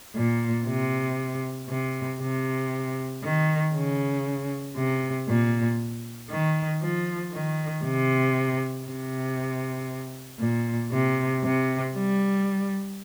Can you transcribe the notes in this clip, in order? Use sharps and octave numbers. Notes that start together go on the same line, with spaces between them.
A#2
C3
C3
C3
D#3
C#3
C3
A#2
D#3
F3
D#3
C3
C3
A#2
C3
C3
G3